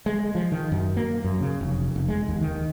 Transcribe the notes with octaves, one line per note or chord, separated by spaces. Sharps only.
G#3
F3
D#3
F#2
A#3
F#2
C#3
F1
F1
G#3
D#2
D#3